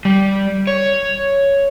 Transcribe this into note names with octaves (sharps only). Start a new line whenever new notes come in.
G3
C#5